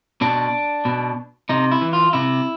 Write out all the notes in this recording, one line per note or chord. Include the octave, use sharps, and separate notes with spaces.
B2 D4
B2
C3 D#4
E4
E3
F4
C3 E4